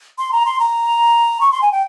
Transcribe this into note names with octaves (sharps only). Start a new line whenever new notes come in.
C6
A#5
C6
A#5
C#6
C6
G#5
G5